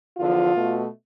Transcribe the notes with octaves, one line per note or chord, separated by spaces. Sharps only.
E2 D3 F3 F4
B2 A3